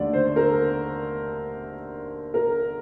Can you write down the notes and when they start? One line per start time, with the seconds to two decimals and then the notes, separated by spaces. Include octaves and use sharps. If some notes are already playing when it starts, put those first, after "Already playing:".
Already playing: D#2 D3 A3 D5
0.13 C5
0.36 A#4
2.34 A#4